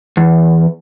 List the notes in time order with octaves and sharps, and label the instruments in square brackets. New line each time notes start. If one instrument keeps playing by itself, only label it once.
[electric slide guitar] E2